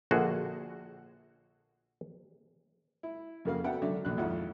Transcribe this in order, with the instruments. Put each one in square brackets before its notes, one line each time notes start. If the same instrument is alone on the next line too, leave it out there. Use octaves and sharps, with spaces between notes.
[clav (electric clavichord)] A#1 D3 F#4 G#4
[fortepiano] E4
F2 C#3 A#3 F#4 F5
B3 D4 A4 E5 F#5 G5
D3 F#3 D4 E5
A#1 D3 F#6
G#1 F2 E4 F4 F#5